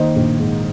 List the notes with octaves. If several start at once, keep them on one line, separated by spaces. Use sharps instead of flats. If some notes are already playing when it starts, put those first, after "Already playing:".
Already playing: D#3 A#3 C5 D#5
A#1
G#2